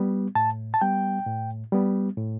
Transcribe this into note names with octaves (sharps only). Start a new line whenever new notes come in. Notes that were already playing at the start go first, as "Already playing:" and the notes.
Already playing: G3 B3
A2 A5
A5
G3 B3 G5
A2
G3 B3
A2